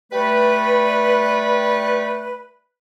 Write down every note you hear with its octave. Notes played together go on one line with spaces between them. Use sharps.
G3 A3 B4